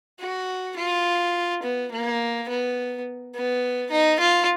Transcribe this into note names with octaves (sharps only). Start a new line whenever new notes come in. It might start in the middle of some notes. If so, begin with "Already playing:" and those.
F#4
F4
B3
A#3
B3
B3
D#4
F4